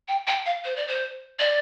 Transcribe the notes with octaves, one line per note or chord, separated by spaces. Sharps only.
G5
G5
F5
C5
D5
C5
D5